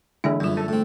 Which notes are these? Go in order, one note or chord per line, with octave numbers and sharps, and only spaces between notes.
D3 E3 G#3 A#3 D4 E4
F#2 E3 G3 F4
A4
A2 C4